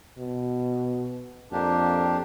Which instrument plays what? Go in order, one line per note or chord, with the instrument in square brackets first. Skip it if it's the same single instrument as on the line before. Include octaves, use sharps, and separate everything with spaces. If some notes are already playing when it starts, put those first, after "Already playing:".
[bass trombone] B2
[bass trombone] F2 [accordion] A#3 D4 G4